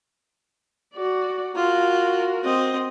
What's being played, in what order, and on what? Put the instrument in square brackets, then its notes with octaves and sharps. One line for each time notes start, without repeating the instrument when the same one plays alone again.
[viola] F#4 D5
[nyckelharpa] F4 [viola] F#4 A#4
[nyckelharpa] C4 D#5